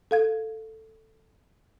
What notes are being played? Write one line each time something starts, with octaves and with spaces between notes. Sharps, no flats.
A4 F5 G#6